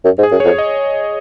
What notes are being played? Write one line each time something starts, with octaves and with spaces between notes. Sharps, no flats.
F#2
G#2
G#4
F#2
F2 C#5
D#5